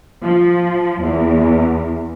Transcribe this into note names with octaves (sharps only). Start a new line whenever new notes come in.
F3
E2